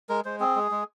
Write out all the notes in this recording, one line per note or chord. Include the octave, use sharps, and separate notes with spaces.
G#3 A#4
G#3 C5
C4 G#4
G#3
G#3